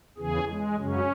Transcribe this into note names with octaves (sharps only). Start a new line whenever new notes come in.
E2 C#3 E3 G#4
G#3
F#2 C#3 F#3 C#4